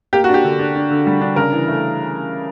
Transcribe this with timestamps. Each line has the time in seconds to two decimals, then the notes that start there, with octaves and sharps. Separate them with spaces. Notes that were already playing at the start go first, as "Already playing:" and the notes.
0.13 A#3 G4
0.24 D4 F#4
0.34 G4
0.44 D3
0.59 D4
0.76 D4
0.91 D3
1.07 G3
1.21 D4
1.36 C#3 A#4
1.52 E3
1.68 A3